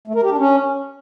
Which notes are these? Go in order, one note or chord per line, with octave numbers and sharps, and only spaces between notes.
A3
A#4
G4
D4
C#4